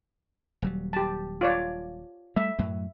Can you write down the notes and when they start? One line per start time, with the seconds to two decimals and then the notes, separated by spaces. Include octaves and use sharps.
0.62 D#1 F#3 G3
0.93 G4 A5
1.41 F4 C#5 D5
2.36 G3 A3 E5
2.59 F#2 A2 F#3